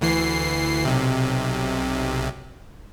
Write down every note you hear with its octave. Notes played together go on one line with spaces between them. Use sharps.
D2 E3 C7
B1 C3